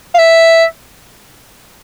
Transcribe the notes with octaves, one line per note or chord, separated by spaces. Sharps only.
F5
E5